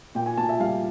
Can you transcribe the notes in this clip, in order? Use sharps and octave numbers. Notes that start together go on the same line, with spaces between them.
A#2 G5
G#5
A#2 A5
E5
G3 F5